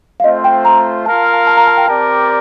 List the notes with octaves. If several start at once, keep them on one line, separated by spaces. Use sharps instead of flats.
F5
A3 C4 F4 C5 D#5
G5
A#5
F4 A#4 F5 A5
A5
A5
A#5
A5
G5
C4 G4 A#4 D5 A5